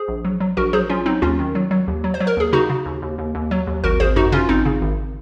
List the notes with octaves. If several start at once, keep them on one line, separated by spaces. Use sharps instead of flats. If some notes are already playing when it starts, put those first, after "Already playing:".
Already playing: G#4 C5
A#1
F#3
F#3
A#1 F#4 A#4
F#3 G#4 C5
F#3 C#4 F4
F#3 C4 D#4
D#2 C#4 F4
D#3
F#3
F#3
D#2
F#3
C5
F#3
A#4
D#2 G#4
C#3 D#4 F#4
C#3
D#2
D#2
D#2
D#2
F#3
D#2
G#1 F#4 A#4
G#1 G#4 C5
F#2 D#4 F#4
C#3 C#4 F4
G#1 C4 D#4
C#3
G#1